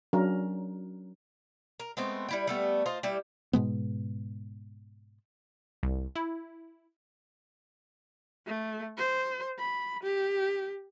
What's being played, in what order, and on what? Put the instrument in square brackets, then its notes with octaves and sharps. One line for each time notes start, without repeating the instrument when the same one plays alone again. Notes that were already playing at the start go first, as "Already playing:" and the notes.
[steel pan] F#3 C#4 D4 A#4
[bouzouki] A#4
G#3 A3 B3 C4
G3 E4 G5
G3 A3 B3
F4 C5 D#5
G3 E4 G4
[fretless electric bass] G#2 B2 G#3 B3
[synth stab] C2
E4
[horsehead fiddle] A3
C5
B5
G4